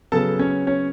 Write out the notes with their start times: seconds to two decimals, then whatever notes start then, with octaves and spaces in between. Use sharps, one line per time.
0.12 C#3 F#3 B3 A4 A5
0.39 C#4 C#5
0.67 C#4 C#5